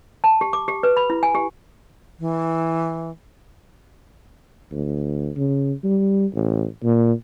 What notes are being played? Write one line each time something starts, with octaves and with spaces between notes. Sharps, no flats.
A5
G4
D6
G4
B4
B5
E4
G#5
G4
E3
D2
C#3
G3
A1
A#2